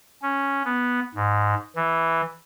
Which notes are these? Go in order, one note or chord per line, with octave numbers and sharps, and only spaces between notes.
C#4
B3
G#2
E3